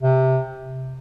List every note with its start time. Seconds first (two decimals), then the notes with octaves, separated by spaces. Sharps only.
0.03 C3